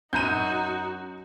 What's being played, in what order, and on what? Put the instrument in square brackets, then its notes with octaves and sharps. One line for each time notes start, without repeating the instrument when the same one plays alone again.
[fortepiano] F#2 A#5 [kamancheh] D#4 [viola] F#4 [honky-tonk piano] G6 D#7